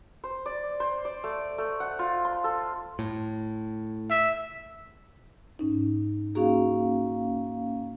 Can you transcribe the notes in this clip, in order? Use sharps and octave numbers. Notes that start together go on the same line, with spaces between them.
C5
D5
C5
D5
A3
A3
F#5
F4
C6
A4
A2
E5
G#2 C#4 D#4
A#3 C#4 D#4 F#4 G#4 F5